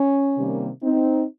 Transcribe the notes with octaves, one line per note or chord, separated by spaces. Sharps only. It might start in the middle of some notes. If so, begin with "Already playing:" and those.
Already playing: C#4
C3 D#3 G3 A#3
C4 D#4